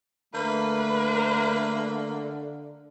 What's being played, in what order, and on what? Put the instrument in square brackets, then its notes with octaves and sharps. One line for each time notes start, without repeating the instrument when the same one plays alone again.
[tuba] D3 [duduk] A3 [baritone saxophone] A#3 [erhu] B4